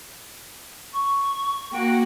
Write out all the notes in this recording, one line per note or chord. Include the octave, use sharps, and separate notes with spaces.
C#6
A#3 F#4 G5